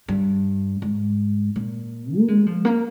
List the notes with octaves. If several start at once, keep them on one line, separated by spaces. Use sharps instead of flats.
G2
G#2
A#2
A#3
G#3
F3
A#3